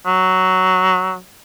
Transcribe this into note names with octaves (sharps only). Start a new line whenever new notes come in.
F#3